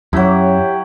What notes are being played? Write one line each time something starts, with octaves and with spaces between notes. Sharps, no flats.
F#2 F#3 E4 G4